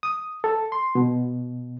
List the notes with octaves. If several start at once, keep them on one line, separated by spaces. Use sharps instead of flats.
D#6
A4
C6
B2